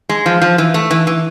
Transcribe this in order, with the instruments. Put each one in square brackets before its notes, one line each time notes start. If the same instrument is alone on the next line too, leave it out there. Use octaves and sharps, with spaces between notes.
[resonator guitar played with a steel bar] G#3
F3
F3
E3
A3
E3
E3